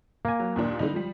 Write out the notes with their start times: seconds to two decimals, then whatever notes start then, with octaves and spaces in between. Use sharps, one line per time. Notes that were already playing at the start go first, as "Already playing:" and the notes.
0.25 A#3 G#5
0.39 F#3
0.56 D#2 A#2 D4
0.79 D3 G3 D#4
0.94 F3 G3